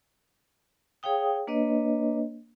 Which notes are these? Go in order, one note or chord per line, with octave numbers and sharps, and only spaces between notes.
G#4 C#5 F5 G5 D#6
A#3 D4 B4 C#5 D#5